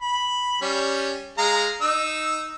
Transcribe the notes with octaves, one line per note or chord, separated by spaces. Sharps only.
B5
G3 C#4
G#3 F5 A#5
D#4 E6